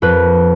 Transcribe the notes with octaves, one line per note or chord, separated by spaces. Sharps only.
F2 B4